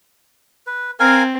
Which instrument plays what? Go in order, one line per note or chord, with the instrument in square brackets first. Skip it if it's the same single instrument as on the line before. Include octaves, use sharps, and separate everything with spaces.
[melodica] B4
[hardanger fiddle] C4 [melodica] A#4 F5 G#5